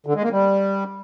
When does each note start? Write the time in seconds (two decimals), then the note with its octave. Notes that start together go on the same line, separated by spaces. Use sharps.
0.06 D3
0.15 G#3
0.23 A#3
0.32 G3